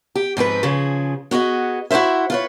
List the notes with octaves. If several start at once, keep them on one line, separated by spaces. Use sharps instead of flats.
G4
G#2 F3 C4 B4
C#3 F3 G#4
B3 F#4 G#4 D#5
E4 F#4 A4 C5 E5
F4 B4 C#5